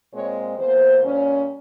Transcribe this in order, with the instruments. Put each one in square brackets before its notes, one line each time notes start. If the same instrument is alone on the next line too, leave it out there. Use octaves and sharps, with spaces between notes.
[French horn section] A#2 G#3 C4 C#5
E2 E3 A#3 C5
A#2 G3 C#4